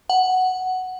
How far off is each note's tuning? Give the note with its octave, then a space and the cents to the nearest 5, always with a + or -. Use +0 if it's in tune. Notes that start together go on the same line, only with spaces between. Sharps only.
F#5 +5